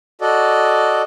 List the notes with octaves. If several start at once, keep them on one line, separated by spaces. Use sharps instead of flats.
F#4 A4 D5 D#5